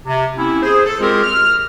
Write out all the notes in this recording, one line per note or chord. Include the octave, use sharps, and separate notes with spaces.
C3
A#3 C4 C#4 E4
G#4 C5
A4
G#3 C4 F4 G4 G#4 A#4
F6